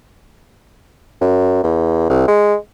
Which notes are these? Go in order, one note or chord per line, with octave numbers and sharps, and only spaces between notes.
F#2
E2
C2
G#3